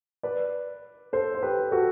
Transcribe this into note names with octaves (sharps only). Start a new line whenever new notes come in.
B4 D5
A4 C5
C5
G4 B4
F#4 A4